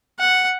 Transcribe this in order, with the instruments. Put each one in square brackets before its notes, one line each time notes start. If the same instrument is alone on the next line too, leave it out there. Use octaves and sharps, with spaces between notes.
[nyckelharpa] F#5